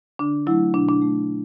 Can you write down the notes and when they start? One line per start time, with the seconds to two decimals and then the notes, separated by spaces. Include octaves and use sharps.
0.19 D3 D4
0.47 F#3 A3 E4
0.74 B2 D4
0.89 D4
1.02 A3